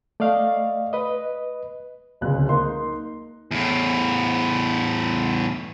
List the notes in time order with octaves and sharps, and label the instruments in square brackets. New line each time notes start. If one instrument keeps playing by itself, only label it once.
[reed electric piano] A3 D5 D#5 F5
B4 D#5
[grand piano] D1 C#2 G#3 F#6
A#3 D#4 C6
[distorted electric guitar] E2 A2